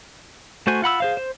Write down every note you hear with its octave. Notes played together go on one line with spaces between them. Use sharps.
A3 F#4 C5 G#5
F4 F#5 B5 E6
G#4 C5 F5
C5